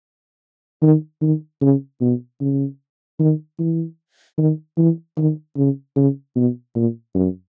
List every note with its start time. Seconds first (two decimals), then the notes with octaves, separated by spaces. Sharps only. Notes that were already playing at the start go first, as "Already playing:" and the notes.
0.82 D#3
1.22 D#3
1.61 C#3
2.01 B2
2.41 C#3
3.20 D#3
3.59 E3
4.38 D#3
4.78 E3
5.17 D#3
5.57 C#3
5.96 C#3
6.36 B2
6.75 A#2
7.15 F#2